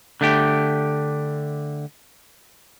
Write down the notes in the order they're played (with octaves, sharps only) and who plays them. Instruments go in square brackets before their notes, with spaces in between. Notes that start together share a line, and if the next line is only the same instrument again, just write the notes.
[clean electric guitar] D3 A3 G4